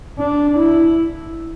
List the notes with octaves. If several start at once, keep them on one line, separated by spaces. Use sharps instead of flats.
D4
E4